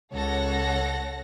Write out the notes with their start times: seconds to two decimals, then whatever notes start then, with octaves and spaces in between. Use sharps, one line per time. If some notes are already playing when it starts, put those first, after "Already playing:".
0.13 C#2 A4 C#5 F#5 A#6